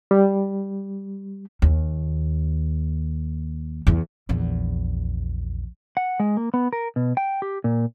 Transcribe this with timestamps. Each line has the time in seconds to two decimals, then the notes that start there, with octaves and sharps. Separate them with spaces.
0.11 G3
1.62 D#2
3.87 E2
4.29 A#1 E2
5.97 F#5
6.20 G#3
6.37 A#3
6.54 B3
6.73 A#4
6.96 B2
7.17 G5
7.42 G4
7.64 A#2